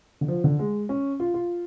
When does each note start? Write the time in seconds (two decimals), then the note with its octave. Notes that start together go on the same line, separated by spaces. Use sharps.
0.21 D3
0.28 F3
0.44 D3
0.59 G#3
0.89 C#4
1.20 F4
1.34 F4